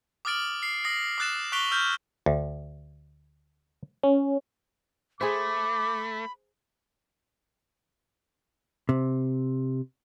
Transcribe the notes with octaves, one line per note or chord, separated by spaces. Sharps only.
D6 D#6 F6 A6 D7 F#7
C7
D#6 A#6 C7 F#7
D6 D#6 F#6 A6 E7
C#6 F#6 B6 D7 F7 G7
E6 F6 G6
D2
C#4
A3 G#4 C5 B5 D6
C3